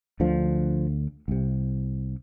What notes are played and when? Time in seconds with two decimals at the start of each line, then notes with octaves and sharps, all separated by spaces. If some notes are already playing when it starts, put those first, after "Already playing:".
0.20 D2 D3 F3
1.28 C2 C3